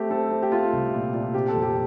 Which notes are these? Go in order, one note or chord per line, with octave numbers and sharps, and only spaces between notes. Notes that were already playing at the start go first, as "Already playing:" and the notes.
Already playing: A3 C4 G4
C4 A4
C4
G4
A3 F4
C2
A#2
A#2
C3 G4
A4
F2
G4